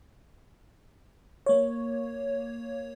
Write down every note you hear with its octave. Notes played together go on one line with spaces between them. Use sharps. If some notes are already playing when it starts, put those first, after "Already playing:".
A#3 C#5